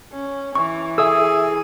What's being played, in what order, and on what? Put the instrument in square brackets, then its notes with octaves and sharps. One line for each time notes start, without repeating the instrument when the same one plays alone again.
[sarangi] C#4
[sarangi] E3 [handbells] C#6
[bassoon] G#4 [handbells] A4 [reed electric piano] E5 D#6 E6